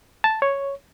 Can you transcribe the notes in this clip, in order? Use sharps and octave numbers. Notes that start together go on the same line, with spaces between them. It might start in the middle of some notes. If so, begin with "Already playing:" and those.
A5
C#5